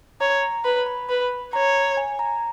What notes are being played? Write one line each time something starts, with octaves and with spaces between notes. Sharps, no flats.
C#5 A#5
A#5
B4 B5
B5
B4 B5
C#5 A#5
G#5
A#5